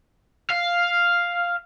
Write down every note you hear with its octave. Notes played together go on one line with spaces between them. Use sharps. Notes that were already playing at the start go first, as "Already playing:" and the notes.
F5